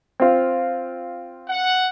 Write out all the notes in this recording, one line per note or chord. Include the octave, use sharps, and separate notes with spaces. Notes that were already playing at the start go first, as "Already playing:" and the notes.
C4 F4
F#5